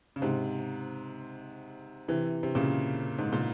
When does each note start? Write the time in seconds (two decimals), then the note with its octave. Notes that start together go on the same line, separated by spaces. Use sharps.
0.16 C#3
0.22 G#2 C3
2.08 C3 E3
2.43 C3
2.55 A#2 C#3
3.18 G#2
3.33 A#2